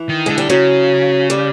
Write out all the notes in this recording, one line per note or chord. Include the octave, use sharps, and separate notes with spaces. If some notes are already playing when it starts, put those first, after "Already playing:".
Already playing: E3
D#3
D3 G#3
G3
C#3 F#3
G3